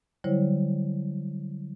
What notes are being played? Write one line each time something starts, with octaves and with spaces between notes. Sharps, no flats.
D3 F#3 G3 E4 C5 C#5